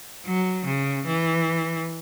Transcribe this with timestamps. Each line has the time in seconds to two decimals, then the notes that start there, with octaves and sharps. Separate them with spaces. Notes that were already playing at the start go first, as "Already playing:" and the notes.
0.26 F#3
0.65 C#3
1.06 E3